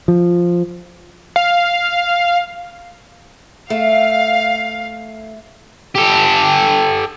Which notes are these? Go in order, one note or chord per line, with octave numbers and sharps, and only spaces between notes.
F3
F5
A3 F5
G4 A4